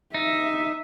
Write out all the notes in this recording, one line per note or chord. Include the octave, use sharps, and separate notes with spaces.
D#4 E5